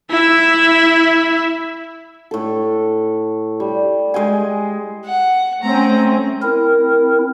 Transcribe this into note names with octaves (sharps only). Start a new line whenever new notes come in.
E4 E5
A2 A4
G3
G#3 G5 G#5
F#5
A3 C4 C#4 A#5
C4 E4 A#4